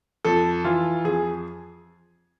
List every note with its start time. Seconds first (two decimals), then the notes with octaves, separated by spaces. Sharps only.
0.25 F2 A4
0.64 E3 F4
1.04 F2 G#4